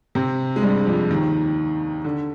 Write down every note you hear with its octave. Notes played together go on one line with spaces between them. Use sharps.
C3 C4
G#3
G2 G3
F2 F3
D#2 D#3
D3